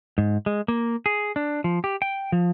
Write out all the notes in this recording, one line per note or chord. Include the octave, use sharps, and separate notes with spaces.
G#2
G#3
A#3
G#4
D4
F3
G4
G5
F3